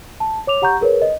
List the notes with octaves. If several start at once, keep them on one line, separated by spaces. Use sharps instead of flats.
A5
C#5 D6 F7
G4 F#5 A#5 C#6 G6
G#4 A#4 B4 C#5
D#5